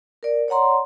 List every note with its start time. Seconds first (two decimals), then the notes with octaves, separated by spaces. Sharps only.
0.23 A#4 D5
0.48 C#5 D5 F#5 A#5 C6